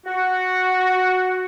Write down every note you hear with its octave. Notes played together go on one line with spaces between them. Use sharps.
F#4